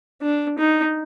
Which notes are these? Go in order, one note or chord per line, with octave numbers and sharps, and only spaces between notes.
D4
D#4